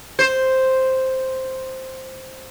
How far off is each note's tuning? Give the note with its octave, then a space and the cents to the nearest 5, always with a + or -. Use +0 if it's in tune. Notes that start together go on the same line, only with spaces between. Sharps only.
C5 +0